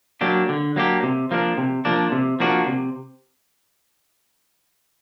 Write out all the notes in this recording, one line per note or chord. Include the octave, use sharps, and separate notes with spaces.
F#3 A#3 D4 G4
D3
F#3 A#3 D4 G4
C3
F3 A#3 D4
C3
F3 A#3 D4
C3
F3 A#3 D4 F#4
C3